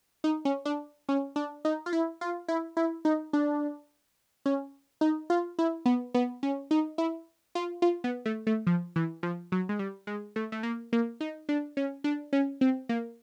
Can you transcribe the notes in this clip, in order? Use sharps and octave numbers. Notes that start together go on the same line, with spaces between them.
D#4
C#4
D4
C#4
D4
D#4
F4
E4
F4
E4
E4
D#4
D4
C#4
D#4
F4
E4
B3
B3
C#4
D#4
E4
F4
F4
B3
A3
A3
F3
E3
F3
F#3
G#3
G3
G#3
A3
A3
A#3
A#3
D#4
D4
C#4
D4
C#4
C4
A#3